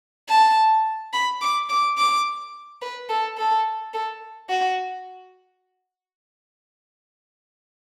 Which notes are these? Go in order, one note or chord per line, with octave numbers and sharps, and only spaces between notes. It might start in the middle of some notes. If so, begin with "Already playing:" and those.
A5
B5
D6
D6
D6
B4
A4
A4
A4
F#4